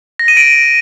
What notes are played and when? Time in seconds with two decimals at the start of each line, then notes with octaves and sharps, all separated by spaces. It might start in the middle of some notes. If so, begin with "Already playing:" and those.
0.19 A#6
0.28 D#7
0.37 D7